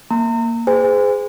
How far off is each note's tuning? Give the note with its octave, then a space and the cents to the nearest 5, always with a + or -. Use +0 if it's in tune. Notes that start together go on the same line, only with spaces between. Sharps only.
A#3 +0 A#5 -35
G#4 +0 C5 -35 G#5 -35